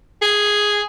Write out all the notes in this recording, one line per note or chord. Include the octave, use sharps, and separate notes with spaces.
G#4